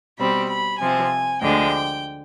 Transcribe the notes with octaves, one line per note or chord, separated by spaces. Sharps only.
B2 G3 C4 B5
B5
C3 F3 C4 G#5
D2 D3 F3 G#3 G5